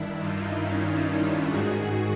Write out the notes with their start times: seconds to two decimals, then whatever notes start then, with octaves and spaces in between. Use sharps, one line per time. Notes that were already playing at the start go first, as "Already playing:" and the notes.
Already playing: G2 D#3 D4 E4
0.18 D#4 F4
0.60 C#4 D#4
1.03 C#4 D#4
1.46 G#2 D#3 F#4 G#4